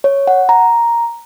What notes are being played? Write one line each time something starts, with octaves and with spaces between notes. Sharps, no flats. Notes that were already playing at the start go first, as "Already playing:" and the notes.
C#5
F#5
A#5